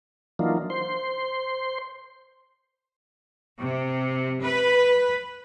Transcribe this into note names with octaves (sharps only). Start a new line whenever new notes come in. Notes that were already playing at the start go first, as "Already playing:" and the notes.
E3 F#3 A#3 D4 D#4 F4
C5 C6
C3
B4